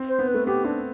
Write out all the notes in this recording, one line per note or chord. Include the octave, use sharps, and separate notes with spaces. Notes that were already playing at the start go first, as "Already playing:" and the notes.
Already playing: C4
C5
B3
B4
A3
B3 G4
C4 D4